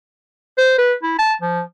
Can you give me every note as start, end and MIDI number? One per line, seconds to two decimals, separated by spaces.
0.58 0.73 72
0.78 0.93 71
1.03 1.16 64
1.19 1.34 81
1.42 1.61 53